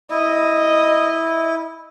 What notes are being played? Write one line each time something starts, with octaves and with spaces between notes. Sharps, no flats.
E4 D#5